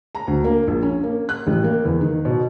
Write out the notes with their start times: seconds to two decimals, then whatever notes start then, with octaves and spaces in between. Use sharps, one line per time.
0.15 A#5
0.27 D2
0.44 A#3
0.68 A#1
0.83 C#4
1.04 A#3
1.29 F#6
1.47 A1
1.64 A#3
1.85 E2
2.01 D#3
2.25 B2